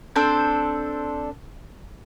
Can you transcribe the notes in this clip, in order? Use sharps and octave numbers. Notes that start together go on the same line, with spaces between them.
C4 D4 A4 C5